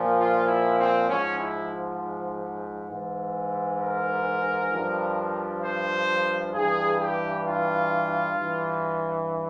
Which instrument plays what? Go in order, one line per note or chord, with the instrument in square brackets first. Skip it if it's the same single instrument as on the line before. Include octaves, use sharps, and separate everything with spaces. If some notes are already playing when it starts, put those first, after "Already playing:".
Already playing: [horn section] A#2 F3
F4
E4
C4
G#2 F3 C#4
E4
G#2 E3
A#4
G2 F3
C5
G2 E3 G#4
G4
F4
G2 E3